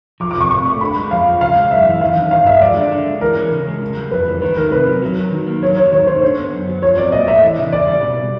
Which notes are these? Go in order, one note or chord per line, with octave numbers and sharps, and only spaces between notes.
F3 D6
D6
C3 C#6
C3 C#6
A3
D3 B5
G#3
F2 F5
F3
C#3 F5
G#3
F#2 E5
E3
D#3 F5
C#4
G2 F5
G#3 E5
F3 D5
D3
D3
G#3
E3 A#4
C#4
C#3
G#3
C#3
G3
F2 B4
E3
D#3 B4
A3 A#4
C3 B4
F#3
F#3
D#3
D#3
A#3
F#3 C#5
D#3 C#5
D#3 C#5
A3 C5
D3
B3
F#2
F#3
F3 C#5
C4 D5
A#2 D#5
A3 E5
E3
C#3
C#3 D5
G3
B2